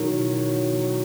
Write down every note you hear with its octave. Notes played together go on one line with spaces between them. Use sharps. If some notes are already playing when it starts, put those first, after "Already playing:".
Already playing: B2 D#3 F#3 B3 E4
C#5
F#4
B3
F#3